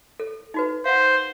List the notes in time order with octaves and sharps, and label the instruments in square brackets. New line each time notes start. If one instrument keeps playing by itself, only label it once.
[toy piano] A4
D#4 F#4 B4
[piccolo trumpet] C5 [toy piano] F5 F#5